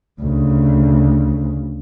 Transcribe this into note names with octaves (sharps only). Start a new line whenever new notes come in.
D2 C#3